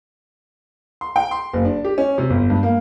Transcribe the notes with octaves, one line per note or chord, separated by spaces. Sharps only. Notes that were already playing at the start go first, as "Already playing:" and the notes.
C6
G5
C6
F#1
D4
G4
C#4
C3
G1
G2
A#3